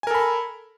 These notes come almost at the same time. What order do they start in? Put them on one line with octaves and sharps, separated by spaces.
G#5 A#4 A4 B5